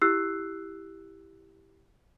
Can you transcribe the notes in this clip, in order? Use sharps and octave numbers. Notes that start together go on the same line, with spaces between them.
E4 G4 E6 F#6 C7